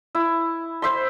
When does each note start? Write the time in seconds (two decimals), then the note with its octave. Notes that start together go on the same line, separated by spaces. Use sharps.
0.15 E4
0.82 C5 E5 C6